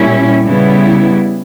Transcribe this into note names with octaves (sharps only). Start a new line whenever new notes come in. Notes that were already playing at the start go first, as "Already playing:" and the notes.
Already playing: A#2 G3 C#4 E4
C#3 G3 B3 E4